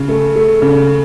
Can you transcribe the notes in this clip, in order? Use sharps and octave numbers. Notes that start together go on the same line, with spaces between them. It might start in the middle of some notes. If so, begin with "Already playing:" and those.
Already playing: C#3
A3
A3
C#3